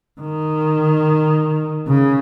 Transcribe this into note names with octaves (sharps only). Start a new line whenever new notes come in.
D#3
C#3